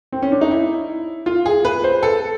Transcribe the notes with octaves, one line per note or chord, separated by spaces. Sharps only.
C4
C#4
D4
D#4
E4
F4
G#4
B4
C5
A4